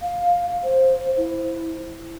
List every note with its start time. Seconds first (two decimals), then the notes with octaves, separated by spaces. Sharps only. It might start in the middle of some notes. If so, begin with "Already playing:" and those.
0.01 F5
0.64 C5
1.17 E4